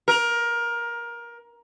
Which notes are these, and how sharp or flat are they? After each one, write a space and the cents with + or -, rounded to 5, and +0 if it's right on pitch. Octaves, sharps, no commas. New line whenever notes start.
A#4 +20